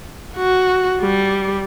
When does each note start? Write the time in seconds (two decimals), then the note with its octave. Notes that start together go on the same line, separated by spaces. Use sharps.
0.37 F#4
1.01 G3